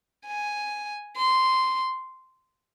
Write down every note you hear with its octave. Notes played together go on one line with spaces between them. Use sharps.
G#5
C6